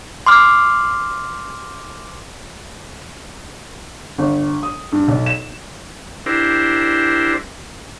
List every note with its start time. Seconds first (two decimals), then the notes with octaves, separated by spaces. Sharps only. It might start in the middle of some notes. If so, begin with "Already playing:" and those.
0.26 C6 D6 F6
4.18 G1
4.63 D#6
4.92 G2
5.08 B1
5.26 E7
6.26 D4 E4 G4 A#4 C5